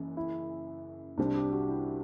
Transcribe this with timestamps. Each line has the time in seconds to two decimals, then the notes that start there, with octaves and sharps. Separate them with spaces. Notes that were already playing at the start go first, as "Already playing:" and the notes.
Already playing: F#1 F#2 E3
0.17 E4
1.18 C2 C3 G3 C4 D4
1.35 G4
1.52 F#4
1.68 E4